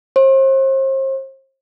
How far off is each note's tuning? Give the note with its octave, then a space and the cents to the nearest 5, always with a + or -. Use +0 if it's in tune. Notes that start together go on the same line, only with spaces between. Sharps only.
C5 +40